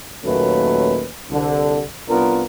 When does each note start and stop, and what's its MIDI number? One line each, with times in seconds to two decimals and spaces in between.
0.24 1.06 39
0.24 1.06 46
0.24 1.06 54
0.24 1.06 57
0.24 1.06 61
0.24 1.06 71
1.30 1.85 36
1.30 1.85 50
2.09 2.43 36
2.09 2.43 59
2.09 2.43 62
2.09 2.43 65
2.09 2.43 70